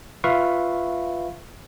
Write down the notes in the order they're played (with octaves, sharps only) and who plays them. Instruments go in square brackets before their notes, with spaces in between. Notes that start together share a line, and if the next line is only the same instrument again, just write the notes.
[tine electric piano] F4 B4 E5 F5 C#6